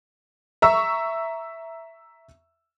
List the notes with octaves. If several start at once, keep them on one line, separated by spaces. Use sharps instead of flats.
E5 A#5 C#6 E6